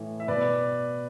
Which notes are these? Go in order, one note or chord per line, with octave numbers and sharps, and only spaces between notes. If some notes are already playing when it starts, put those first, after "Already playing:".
Already playing: A2 E3
E5
B2 B4 D5